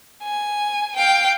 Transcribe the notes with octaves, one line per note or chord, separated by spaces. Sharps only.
G#5
F5 G5